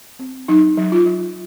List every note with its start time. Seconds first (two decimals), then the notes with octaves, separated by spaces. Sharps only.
0.19 C4
0.48 F#3 D#4
0.78 F#3
0.92 F4
1.06 F#3